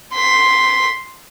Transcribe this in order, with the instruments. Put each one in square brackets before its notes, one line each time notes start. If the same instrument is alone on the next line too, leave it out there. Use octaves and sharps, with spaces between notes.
[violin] C6 B6